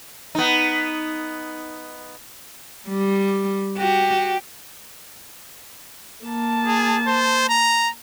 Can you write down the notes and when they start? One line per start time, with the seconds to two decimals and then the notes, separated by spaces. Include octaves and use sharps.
0.35 B3 D#4
2.88 G3
3.78 F#4 G4
6.25 A#3 A5
6.66 G#4
7.07 C5
7.49 A#5